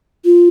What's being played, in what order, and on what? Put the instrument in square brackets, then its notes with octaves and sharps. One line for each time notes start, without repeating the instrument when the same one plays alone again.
[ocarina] F4